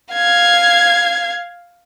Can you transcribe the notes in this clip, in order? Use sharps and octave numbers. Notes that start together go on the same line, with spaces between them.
F5 G#6